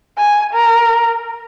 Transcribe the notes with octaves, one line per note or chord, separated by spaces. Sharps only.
G#5
A#4